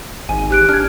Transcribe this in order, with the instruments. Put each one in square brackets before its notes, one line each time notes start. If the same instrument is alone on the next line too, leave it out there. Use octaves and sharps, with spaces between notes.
[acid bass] G#1 [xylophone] G#5
[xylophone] G4 F#6 D7
[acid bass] D4 [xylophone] F6 G#6